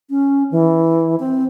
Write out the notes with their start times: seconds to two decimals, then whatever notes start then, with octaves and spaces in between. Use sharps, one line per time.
0.10 C#4
0.51 E3
1.19 C4